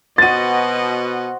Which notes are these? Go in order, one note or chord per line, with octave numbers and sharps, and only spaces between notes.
B2 B3 F#4 C5 D#5 F#5 A6 D#7